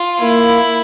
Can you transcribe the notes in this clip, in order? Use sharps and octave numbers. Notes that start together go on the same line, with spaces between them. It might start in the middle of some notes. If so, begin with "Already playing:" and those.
Already playing: F4
A#3 E4